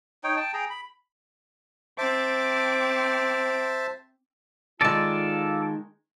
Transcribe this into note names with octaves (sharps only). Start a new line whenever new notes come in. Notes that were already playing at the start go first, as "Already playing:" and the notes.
D#4 C#5 G5
G5 A5
G#4 G5 A#5
B5
C4 C5 E5 A5 D6
D#3 G#3 F4 A4 D5 A5